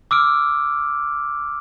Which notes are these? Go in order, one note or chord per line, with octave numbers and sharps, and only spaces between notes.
D6 E6 F6 D7